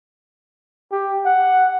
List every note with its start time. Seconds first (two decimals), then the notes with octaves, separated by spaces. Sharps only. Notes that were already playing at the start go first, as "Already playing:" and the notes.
0.92 G4
1.25 F#5